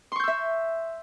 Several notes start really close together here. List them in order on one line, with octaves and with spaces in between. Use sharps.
C6 C#6 G6 E6 E5